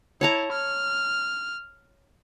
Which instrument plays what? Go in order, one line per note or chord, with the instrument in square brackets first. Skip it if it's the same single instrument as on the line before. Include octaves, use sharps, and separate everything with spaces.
[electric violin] E4 [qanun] C#5 A5 A#5
[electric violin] F6